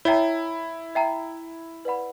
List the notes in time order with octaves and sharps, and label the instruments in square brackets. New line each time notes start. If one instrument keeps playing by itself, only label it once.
[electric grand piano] E4 [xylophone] C#5 E5 G5 A#5
[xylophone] E5 G5 A#5
B4 D5 F#5 B5